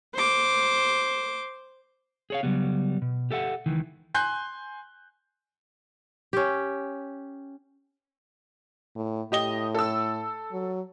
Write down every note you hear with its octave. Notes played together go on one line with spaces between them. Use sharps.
C5 D6
G#4 C#5 F5
C#3 F#3 G3 B3
B2
G4 A4 E5 F#5
C#2 D#3 E3
G#5 C6 F#6 G6
C#4 G4
A2
A2 G4 D#5 G7
A4 E6
F#3